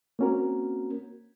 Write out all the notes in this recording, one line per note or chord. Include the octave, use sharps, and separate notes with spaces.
A#3 C4 C#4 F#4 A#4